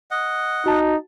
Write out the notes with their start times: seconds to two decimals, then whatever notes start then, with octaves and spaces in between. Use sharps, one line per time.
0.11 D#5 F#5
0.66 D#4 F#4 A5